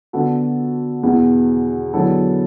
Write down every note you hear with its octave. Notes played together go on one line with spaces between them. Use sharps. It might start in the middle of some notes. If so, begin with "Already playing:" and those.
D3 B3 F#4 A4
E2 B2 B3 E4
D3 F#3 B3 E4 A4